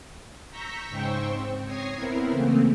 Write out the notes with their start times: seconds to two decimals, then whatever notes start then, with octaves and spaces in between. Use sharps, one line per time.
0.51 A#5 C#6 E6 G6 A#6 B6
0.89 G#2 C#3 C5 G5 C#6 E6
1.26 C4
1.66 C#5 D#6 G#6 A#6 C7
1.96 B3 C4 E4 A#4
2.30 C#3 E3 A3 A#3 C4